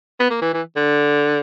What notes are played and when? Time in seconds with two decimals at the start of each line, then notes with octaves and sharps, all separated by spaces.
0.20 B3
0.30 A#3
0.42 E3
0.53 E3
0.76 D3